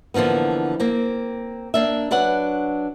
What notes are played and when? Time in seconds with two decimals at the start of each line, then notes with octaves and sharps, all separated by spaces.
0.14 D3 E3 F3 A#3 B3
0.80 A#3 C4
1.74 A#3 D4 E5
2.11 F#3 D4 B4 F#5